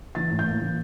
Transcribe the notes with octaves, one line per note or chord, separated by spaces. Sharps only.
E3 A6
A2
G6
A#3
E3